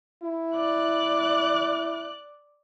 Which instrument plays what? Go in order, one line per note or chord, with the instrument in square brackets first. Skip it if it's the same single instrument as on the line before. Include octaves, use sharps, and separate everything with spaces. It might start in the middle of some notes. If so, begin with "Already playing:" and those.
[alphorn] E4
[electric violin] D5 F#6